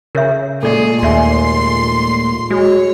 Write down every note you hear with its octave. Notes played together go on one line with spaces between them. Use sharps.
C#3 A#4 C#5 E5
A#2 G#3 A3 G#4 A4 D5
D#2 D5 E5 G#5 C6
G#3 F#4 C#5